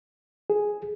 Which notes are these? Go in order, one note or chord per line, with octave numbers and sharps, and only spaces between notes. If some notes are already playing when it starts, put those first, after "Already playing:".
G#4